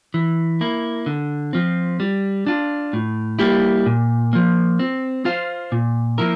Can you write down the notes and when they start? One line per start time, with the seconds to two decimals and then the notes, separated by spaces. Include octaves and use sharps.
0.14 E3
0.61 A#3 E4
1.06 D3
1.53 F3 C4
2.00 G3
2.47 D4 F4
2.93 A2
3.39 G3 A#3 E4 G4
3.86 A#2
4.33 F3 A#3
4.79 C4
5.25 F4 C5 F5
5.72 A#2
6.18 F3 A#3 E4 A#4